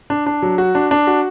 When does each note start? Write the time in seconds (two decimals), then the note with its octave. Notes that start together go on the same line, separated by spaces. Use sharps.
0.10 D4
0.26 D4
0.42 F#3
0.58 F#4
0.75 D4
0.91 D4
1.07 F#4